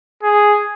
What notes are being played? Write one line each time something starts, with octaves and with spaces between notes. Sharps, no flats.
G#4